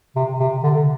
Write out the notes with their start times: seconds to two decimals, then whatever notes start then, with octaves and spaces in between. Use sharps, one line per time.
0.16 C3
0.39 C3
0.63 D3